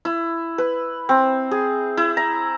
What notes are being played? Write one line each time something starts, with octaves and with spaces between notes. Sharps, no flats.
E4
B4
C4
G#4
E4
A#5